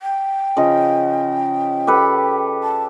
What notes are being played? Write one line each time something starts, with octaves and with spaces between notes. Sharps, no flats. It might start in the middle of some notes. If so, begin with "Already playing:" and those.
G5
C#3 F3 D#5
G4 A4 B4
A5